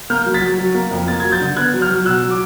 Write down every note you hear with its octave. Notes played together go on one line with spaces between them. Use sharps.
A#3 F6 G6
F#3
A6 B6
F#3
F#3
A#3
F2
A#3 A6
F#3 G#6
G6 A6
D3
B3 F#6 G#6
F#3
F6 G6
F#3
B2 E6 F#6
F#3
D6